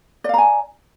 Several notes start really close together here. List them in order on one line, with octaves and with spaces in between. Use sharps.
D5 F5 A#5 G#5